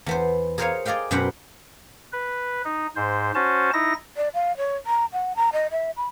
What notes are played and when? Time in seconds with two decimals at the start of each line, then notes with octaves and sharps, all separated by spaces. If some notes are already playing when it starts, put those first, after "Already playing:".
0.06 E2 B3 C5
0.58 G#4 A#4 C5 C#5 F5 G#5
0.85 G#4 D5 D#5 F5 G5
1.11 F#2 B2 B4 C5 F#5 G5
2.13 B4
2.65 D#4
2.96 G#2 C5
3.35 C#4 F#4 C5 A5
3.73 D#4 E4 A#6
4.17 D5
4.34 F5
4.57 C#5
4.87 A#5
5.13 F#5
5.36 A#5
5.53 D#5
5.71 E5
5.97 B5